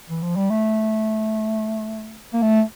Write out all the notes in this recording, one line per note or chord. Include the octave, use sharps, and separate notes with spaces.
E3
F3
G3
A3
A#3
A3